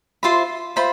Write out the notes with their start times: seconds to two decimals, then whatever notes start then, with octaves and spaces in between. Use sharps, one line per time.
0.23 F4 C5 E5 B5
0.76 F4 C5 E5 B5